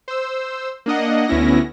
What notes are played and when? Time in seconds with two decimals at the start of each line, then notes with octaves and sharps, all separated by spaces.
0.08 C5 E6
0.86 A#3 D4 D#5 F#5
1.28 D2 B3 C#4 E4 A#6